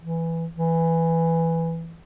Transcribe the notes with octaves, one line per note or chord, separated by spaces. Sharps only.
E3
E3